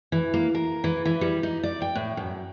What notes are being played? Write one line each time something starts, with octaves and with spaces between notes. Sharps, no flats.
E3
A#3
A#4
E3
E3
G3
D#4
D5
G5
A2
F#2